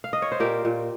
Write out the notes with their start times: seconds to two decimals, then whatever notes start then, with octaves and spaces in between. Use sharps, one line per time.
0.04 F5
0.13 D#5
0.22 C#5
0.32 C5
0.40 A#2 G4 A#4
0.65 A#2